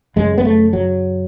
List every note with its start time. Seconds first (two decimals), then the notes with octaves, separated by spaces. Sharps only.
0.16 F#2 C#3 G#3
0.38 B3
0.45 A3
0.73 F#3